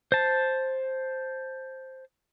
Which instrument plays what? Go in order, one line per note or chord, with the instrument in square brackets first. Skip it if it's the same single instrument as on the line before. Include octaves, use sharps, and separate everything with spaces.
[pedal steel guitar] C5 A5